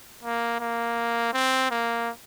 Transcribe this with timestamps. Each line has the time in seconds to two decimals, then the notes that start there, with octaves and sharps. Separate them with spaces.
0.23 A#3
0.60 A#3
1.34 C4
1.71 A#3